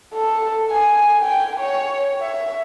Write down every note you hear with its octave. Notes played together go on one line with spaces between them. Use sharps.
A4
G#5
G5
C#5
E5